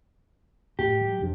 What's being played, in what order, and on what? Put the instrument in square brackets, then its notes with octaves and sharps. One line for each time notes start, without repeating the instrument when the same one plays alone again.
[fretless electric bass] A2 [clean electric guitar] G4
[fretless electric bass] F#3
E1 F2 D4